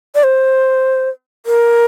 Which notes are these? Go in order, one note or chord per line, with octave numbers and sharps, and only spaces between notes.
D5
C5
A#4